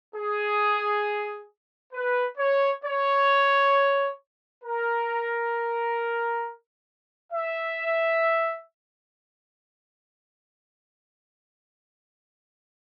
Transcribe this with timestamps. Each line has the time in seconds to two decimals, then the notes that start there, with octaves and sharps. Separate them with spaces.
0.14 G#4
1.93 B4
2.38 C#5
2.83 C#5
4.62 A#4
7.31 E5